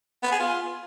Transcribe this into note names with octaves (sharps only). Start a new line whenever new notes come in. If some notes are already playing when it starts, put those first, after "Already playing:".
B3
G#4
F4